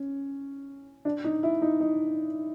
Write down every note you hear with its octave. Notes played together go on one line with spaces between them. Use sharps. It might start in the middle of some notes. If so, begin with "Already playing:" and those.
Already playing: C#4
D4
D#4
E4
D#4
D#4